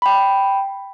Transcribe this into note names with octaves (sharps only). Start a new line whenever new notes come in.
G5 B5